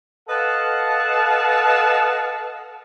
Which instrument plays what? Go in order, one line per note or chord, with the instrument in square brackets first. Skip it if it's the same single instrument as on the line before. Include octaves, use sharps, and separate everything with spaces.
[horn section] A4 B4 D#5 F5 F#5 A5